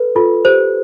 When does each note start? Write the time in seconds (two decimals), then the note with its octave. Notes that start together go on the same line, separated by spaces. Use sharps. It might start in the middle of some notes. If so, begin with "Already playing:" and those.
Already playing: A4 B4
0.15 F4 A4
0.45 G4 C5